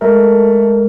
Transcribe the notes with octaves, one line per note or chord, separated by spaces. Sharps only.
G#3 A3 A4 A#4